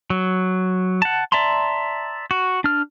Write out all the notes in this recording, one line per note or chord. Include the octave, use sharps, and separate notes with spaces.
F#3
F#5 A5
D5 E5 A5 A#5 C6
F#4
D4 F6